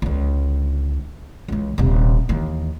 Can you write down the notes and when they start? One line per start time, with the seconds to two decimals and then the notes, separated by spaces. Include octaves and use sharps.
0.02 C#2 D3
1.48 C#2 E3
1.78 D#1 C3
2.29 D#2 E3